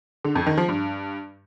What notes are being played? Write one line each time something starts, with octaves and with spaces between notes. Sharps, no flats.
D3
F2
D#3
F3
G2